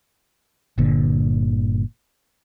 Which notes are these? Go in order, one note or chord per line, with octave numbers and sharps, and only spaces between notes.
G1 A#2 D3